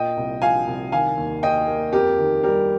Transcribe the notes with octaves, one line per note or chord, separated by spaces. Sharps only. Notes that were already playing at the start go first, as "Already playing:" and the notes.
Already playing: A#2 D#5 G5
C2
F3 F5 G#5
C2
D#3 F5 G#5
D#2
D#2 D#5 G5
A#3
F2 G4 A#4
D#3
G3 G4 A#4